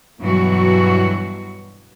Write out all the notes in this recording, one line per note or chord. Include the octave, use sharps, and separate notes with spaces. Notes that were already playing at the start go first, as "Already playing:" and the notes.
G2 B2 E3 F#3 F#4